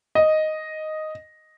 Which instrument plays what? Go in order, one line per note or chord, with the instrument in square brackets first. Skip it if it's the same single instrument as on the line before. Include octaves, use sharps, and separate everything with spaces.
[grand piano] D#5